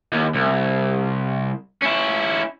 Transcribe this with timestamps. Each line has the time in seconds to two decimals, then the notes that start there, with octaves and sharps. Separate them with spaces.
0.12 D#2
0.34 C2
1.82 C#4 E4